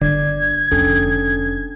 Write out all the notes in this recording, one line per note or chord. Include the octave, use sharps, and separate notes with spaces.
G1 D3 D5 G#6
F1 F2 C#4 D4 A4